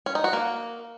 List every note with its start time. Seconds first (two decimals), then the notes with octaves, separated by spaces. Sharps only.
0.06 C#4
0.15 D#4
0.24 F#4
0.33 A#3